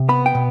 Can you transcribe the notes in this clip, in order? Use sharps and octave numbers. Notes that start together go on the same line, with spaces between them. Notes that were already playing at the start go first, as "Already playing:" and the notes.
Already playing: C3
B3 B5
G5
B2